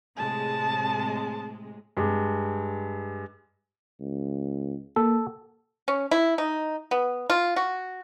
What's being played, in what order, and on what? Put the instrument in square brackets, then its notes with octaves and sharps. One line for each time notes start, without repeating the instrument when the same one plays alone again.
[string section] A2 C3 G#3 [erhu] A5
[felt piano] G2 G#3
[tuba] C#2
[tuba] A#3 [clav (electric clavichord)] A4
[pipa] C#4
E4
D#4
B3
F4
F#4